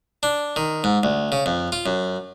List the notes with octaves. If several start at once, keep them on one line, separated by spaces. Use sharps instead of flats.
D4
D#3
G#2
D2
C#3
F2
F4
F#2